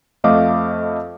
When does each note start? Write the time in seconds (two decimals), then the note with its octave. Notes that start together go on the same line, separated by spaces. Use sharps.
0.24 F2 A3 D#5 F5 D6